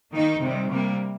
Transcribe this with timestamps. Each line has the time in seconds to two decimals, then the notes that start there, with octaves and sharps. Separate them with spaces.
0.11 D#3 A#3 D#4
0.41 C3 D#3 G3
0.70 C3 G3 A#3